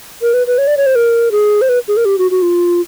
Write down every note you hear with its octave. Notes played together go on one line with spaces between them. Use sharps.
A#4
B4
B4
C#5
D5
C#5
C5
A#4
G#4
C5
B4
G#4
A#4
G4
F#4
F#4
F4